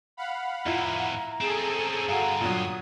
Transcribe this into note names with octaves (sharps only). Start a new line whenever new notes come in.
F5 F#5 B5
F2 A2 E4 F4 A#5
C4 C#4 G#4 A4
G2 D3 F#4 F5 A#5
A#2 F#3 D#6